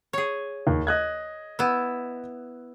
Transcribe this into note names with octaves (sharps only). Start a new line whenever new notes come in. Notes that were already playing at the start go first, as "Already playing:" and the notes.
G#4 C#5
D#2
D#5 F#6 G#6
B3 E4